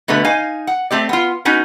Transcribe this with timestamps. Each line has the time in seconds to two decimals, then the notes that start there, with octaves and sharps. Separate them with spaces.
0.08 B2 D3 A3 B4
0.25 D#4 F5 G#5
0.67 F#5
0.91 A3 C4 G4 D5
1.09 B3 F4
1.45 B3 C#4 D#4 F#4